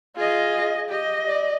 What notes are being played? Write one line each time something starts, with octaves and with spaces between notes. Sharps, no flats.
F4 G#4 D#5
G4 D#5
D5